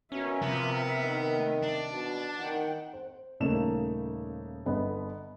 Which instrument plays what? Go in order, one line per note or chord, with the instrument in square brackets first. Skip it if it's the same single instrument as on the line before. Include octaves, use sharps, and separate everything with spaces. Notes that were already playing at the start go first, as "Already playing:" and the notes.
[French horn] B2 [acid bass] C#4 [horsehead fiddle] A#4 E5
[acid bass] C3 [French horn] F3 [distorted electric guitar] B3
[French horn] D#3
[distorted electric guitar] D4
[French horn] B2 [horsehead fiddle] A5
[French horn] D#3 [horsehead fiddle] F#5 G5
[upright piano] C5
D#1 C#3 A3 A#3 D#4 E7
G1 B3 B4 D#5